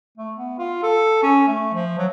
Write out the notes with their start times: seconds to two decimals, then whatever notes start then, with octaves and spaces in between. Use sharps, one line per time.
0.17 A3
0.36 B3
0.59 F4
0.83 A4
1.22 C#4
1.47 A3
1.73 F3
1.98 F#3